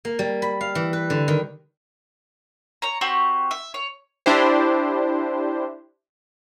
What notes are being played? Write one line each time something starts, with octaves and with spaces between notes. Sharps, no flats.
A#3
G3
B5
F5
E3
B4
D3
D#3
C#5 A#5
C4 F#4 G4 C#6
E5
C#5
D4 E4 G4 C5